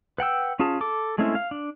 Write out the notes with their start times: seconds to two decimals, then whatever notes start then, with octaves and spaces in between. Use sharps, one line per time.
0.18 B4 F#5 G5 E6
0.59 C#4 F4 G#4 A5
0.81 A4 D6
1.18 G#3 A3 C4 C#4 E4
1.35 F5
1.51 D4